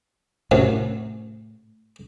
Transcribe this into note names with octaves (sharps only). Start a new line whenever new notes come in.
F#2 A2 C3 F#3